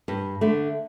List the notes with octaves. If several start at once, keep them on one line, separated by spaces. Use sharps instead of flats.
G2
D3 A3